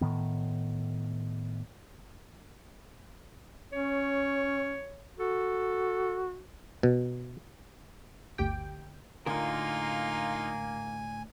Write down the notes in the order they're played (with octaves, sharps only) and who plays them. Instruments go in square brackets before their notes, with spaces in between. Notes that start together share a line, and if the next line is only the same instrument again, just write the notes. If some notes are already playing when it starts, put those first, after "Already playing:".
[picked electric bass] A2 D#3 B3
[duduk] C#4 [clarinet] C#5
[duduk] F#4 [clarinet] A4
[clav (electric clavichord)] B2
[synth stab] G1 D2 G4 G5
[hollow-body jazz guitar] A2 D3 A#4 [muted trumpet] A#3 [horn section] D#4 F4 [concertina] G#5